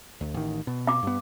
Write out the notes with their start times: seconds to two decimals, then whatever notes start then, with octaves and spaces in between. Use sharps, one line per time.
0.21 D2
0.34 A1 D#3
0.67 B2
0.87 F5 D6
1.03 G2 B3